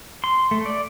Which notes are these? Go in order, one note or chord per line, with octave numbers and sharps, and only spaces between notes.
C6
A3
D5